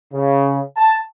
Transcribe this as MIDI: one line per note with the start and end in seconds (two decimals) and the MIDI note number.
0.13 0.60 49
0.77 0.98 81